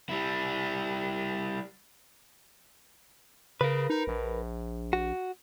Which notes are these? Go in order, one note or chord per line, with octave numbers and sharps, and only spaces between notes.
G3 E4
C#3 A#4 B4
D#4
A#1
F#4